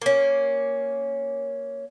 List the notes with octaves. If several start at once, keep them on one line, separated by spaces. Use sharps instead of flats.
A#3 C#4